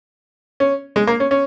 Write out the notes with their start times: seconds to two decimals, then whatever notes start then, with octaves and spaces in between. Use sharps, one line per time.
0.60 C#4
0.96 G#3
1.07 A#3
1.20 C#4
1.31 C#4